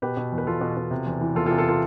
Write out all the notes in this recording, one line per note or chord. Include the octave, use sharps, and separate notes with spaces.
B2 G4 B4
B2
E2
B4
E2 F4 A4
B2
B2
C3
E2
E3
E2 F4 A4
F4 A4
C3
F4 A4
F4 A4